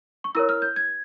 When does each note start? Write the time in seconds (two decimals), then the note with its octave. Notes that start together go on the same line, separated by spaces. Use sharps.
0.24 C#6
0.35 E4 A#4 C#5 E6
0.49 F6
0.62 G6
0.76 G#6